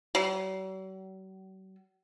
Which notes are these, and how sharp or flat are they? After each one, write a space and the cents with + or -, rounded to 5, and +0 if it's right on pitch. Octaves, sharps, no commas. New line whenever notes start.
F#3 +45